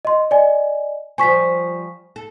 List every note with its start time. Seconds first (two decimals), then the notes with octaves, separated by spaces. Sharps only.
0.05 D#5 C6
0.31 D5 D#5 G#5
1.18 F3 G3 C5 G#5 C#6 B6
2.16 A4